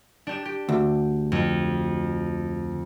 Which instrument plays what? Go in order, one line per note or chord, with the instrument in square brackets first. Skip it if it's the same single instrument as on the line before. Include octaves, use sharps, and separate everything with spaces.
[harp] D4 G4 E7
G4
[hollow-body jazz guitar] D2
[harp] F2